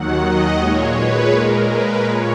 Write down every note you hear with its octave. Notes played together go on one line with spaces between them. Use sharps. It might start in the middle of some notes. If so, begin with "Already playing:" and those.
Already playing: D#2 D#3 F#3 F#5
D#5
A#2 G#3 C#5
B4
A#2 G#3 A#4
B4
A#2 C#5